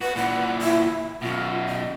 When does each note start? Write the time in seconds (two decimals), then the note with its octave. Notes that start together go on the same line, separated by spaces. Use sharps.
0.01 F#4 B4
0.15 A#2 E3 F#5
0.62 E4
1.22 F#2 B2 F4
1.67 D#5